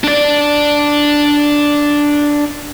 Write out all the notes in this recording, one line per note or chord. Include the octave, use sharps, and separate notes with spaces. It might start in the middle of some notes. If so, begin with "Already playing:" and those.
D4 D5